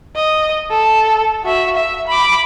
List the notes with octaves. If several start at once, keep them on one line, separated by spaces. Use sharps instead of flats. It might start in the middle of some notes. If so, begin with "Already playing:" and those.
D#5
A4
F#4 E5
E5
B5 D6